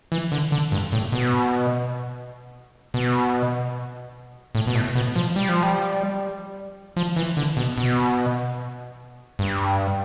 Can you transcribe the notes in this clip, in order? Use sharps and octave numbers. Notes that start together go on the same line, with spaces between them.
E3
D3
D3
G2
A2
B2
B2
A2
B2
A2
B2
F3
G3
F3
G3
F3
E3
D3
B2
B2
G2